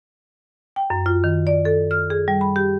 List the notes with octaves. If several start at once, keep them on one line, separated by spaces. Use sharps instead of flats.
G5
F#2
F4
D#3
D5
A4
F6
G#4
G3
B5
G4